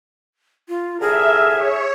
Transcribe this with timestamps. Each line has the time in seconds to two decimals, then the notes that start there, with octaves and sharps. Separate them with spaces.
0.69 F4
1.01 C2 D3 G#4 A#4 E5
1.54 C#5